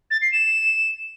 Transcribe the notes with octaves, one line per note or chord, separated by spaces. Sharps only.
A6
C7
E7